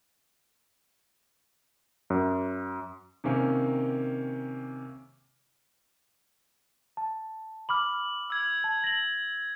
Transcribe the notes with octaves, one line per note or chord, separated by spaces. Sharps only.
F#2
C3 D#3 A#3 C#4
A5
B5 D6 F6 F#7
E6 G#6
A5
A#6 F#7